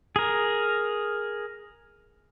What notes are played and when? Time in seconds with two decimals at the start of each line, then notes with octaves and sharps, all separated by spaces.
0.16 G#4 A#4